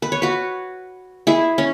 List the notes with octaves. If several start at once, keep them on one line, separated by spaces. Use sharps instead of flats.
B4
C#5
F#4 B4
E4 G#4
C#4